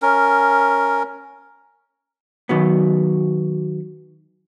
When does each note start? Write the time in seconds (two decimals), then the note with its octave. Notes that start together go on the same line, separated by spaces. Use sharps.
0.02 C#4 A#4
2.49 D#3 F#3 B3